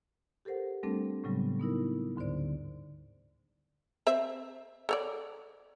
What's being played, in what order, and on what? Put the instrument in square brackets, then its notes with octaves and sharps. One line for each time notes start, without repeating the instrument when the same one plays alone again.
[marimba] G4 A4 A#4 C5 F#5
G3 A3 C4 D4 A4
A2 C#3 F#3 G3 B3
B3 D#4 E4 A#4
D2 G#2 D3 C5 D5
[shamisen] C4 C5 E5
A4 C#5 D5